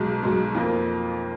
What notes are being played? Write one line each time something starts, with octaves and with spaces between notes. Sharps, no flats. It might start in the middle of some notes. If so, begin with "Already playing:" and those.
Already playing: B1 B2 G#3
B1 B2 G#3
F2 F3 A#3